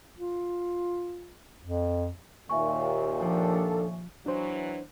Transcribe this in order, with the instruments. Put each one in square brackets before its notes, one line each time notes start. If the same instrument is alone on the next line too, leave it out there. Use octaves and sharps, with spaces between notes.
[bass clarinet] F4
F2
[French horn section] D#2 A#2 [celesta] E5 G#5 C#6
[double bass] F3 [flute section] D4 A4
[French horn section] E3 F#3 [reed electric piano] D4 C5